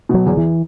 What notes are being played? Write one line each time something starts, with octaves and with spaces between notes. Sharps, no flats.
B2 F#3
E2
E3